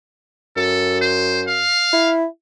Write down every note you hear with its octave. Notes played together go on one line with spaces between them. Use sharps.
F#2 A4
C5
F5
E4